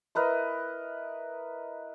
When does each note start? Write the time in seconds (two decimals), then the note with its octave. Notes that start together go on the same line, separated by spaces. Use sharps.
0.15 E4 A#4 B4 D#5